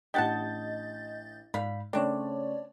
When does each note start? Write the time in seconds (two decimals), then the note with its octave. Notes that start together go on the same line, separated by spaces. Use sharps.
0.14 A1 D4 G4 D#5 F#5 A5 G6 A6
1.54 G#2 D5 F5 B5
1.93 C#3 A3 C4 D4 C#5 D5